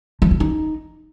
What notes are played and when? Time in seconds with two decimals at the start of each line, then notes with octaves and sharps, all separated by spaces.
0.22 F3
0.31 F4
0.40 D#4